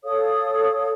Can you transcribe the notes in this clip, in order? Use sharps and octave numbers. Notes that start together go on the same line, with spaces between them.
A4 C#5 F5 D#6